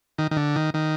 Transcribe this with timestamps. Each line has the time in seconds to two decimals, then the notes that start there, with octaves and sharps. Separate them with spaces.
0.18 D#3
0.31 D#3
0.37 D3
0.56 D#3
0.74 D#3